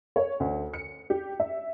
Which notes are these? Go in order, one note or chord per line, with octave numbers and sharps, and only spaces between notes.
C#5
D2
C#7
G4
E5